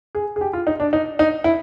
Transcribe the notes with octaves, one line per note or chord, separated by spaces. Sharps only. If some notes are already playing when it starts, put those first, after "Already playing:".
G#4
G#4
G4
F4
D#4
D4
D#4
D#4
E4